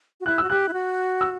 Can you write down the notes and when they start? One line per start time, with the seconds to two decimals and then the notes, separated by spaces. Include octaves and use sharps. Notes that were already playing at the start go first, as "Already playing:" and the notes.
0.20 F#4
0.26 E4 F#6
0.38 E6
0.44 F#4
0.50 G4 F#6
0.69 E4
0.73 F#4
1.21 E6